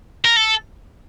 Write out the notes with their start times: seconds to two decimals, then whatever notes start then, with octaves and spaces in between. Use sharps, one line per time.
0.25 A#4
0.36 A4